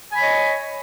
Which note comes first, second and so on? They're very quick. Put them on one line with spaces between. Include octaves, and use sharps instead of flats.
G#5 B5 C#5 D#5